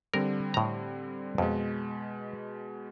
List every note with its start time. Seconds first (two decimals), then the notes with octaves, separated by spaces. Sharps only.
0.14 D3 G3 C4 A#4
0.54 A2 A#5
1.38 F2 B2 G#3